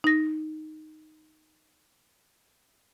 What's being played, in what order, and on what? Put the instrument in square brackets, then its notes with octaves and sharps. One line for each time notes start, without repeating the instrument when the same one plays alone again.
[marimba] D#4 A#6